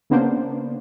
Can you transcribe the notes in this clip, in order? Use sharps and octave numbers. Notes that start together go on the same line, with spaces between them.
C#3 A#3 B3 D4 C5